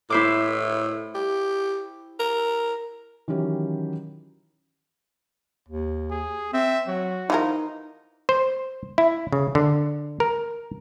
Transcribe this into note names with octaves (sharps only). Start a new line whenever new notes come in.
A2 E4 C5 D6
G4
A#4
D#3 E3 F#3 C#4 G4
D#2
G#4
C4 E5
F#3 F#4
E3 F3 D#4 A#4
C5
E4
C#3
D3
A#4